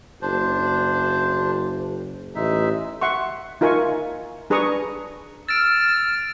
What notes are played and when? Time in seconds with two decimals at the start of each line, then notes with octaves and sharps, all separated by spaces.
0.22 F#1 D4 C5
2.35 A1 G#3 D#4 E5
3.01 E5 F#5 C6 C#6
3.61 D#4 F4 A#4 E5 G#5 C#6
4.50 D4 G#4 B4 A#5 C#6 D#6
5.49 E6 F6 A6 D7